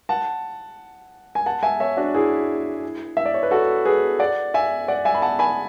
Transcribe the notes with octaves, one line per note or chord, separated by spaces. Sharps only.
F#5 A5
G#5
F#5 A5
E5 G#5
C#5 E5
D4 F#4
E4 G#4
E5
D5
C#5
B4
F#4 A4
G#4 B4
D5 F#5
E5 G#5
D5 F#5
E5 G#5
B5
F#5 A5
G#5 B5